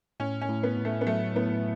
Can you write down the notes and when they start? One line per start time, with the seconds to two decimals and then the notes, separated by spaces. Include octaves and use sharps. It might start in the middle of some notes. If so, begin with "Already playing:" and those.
0.20 A2 C#4
0.41 C#4
0.49 A2
0.63 B3
0.77 A2
0.85 A3
1.01 B3
1.07 F#3 A3
1.36 A2 B3